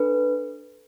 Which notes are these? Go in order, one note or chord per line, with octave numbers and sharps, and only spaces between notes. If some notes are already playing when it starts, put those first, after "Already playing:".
Already playing: D4 A4 B4